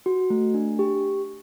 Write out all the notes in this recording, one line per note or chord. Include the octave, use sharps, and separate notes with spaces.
F#4
A3
D4
G4